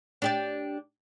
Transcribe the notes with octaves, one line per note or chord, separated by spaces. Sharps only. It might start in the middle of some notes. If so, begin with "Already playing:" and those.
D4 G4 D5